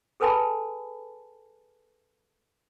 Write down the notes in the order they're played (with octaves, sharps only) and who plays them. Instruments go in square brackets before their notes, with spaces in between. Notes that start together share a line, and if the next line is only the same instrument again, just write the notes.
[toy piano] G#4 A4 B4 G#5 A5 B5